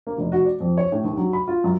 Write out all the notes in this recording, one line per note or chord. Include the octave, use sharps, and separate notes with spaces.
A#3
F1
F#4
D5
F2
C#5
A2
D#2
F#3
B5
F4
F#2